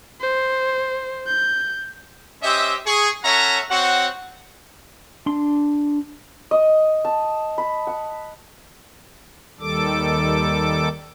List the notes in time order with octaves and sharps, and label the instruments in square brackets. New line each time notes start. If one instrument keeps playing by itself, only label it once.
[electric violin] C5
G6
[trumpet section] C#4 G4 C5 D#5 E5
G#4 C#6
C#4 A4 C#5 E5 F#5 A#5
C4 F#4 C#5 F#5
[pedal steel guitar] D4 C6
[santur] D#5
A5
B5
F#5
[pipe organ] D#2 D#3 G3 A4 D6